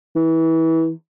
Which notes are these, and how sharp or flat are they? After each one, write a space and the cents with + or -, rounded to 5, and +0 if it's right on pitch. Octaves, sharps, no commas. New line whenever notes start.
E3 -25